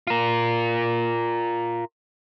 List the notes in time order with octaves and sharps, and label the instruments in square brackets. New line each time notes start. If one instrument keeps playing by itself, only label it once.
[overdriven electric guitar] F4 A#4